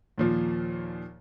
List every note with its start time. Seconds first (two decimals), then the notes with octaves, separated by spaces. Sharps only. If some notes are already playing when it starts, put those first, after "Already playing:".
0.18 D#2 A#2 F3